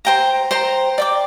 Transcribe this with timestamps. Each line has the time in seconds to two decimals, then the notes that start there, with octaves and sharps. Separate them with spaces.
0.05 C5 G5 A#5
0.51 C5 G5 A#5
0.98 D5 G5 D6